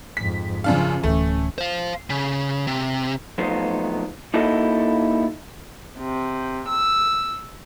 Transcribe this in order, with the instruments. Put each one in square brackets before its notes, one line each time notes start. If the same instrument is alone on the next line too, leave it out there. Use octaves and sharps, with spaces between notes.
[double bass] F2 G#2 [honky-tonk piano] B6
[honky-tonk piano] F#2 D4 F5 [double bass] C#3 F3
[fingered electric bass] D1 D2 [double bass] E3 C#4 [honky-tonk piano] A3
[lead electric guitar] C5 F5
C#3
C3
[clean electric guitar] F3 F#3 A3 B3 D#4 C5
A#3 D#4 E4 F#4 A4 D#5
[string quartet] C3
E6